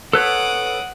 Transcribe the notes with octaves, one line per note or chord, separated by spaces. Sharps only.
A4 B4 C#5 F#5 D6 D#6